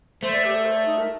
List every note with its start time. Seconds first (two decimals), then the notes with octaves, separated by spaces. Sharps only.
0.22 A3 C5
0.33 D5
0.44 G4
0.55 A4
0.65 C5
0.75 D5
0.86 D#4
0.98 A#4